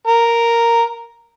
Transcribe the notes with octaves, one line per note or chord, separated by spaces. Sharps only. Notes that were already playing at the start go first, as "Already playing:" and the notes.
A#4